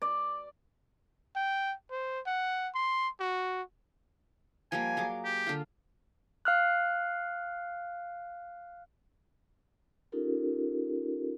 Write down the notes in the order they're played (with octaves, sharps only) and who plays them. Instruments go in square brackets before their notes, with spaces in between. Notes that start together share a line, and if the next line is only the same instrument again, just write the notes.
[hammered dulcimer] D5
[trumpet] G5
C5
F#5
C6
F#4
[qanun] F3 G3 A#3 [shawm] G#5
[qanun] F#3 G#4 D6
[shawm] G4
[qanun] D3 F4
[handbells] F5 F6 F#6
[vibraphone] C#4 D#4 F4 G4 A4 A#4